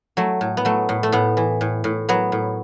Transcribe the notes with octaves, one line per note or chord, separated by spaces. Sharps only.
F#3 A3
A2
B3
F#3 A3
A2
A3
A2 B3
E3
A2
A2
F#3 B3
A2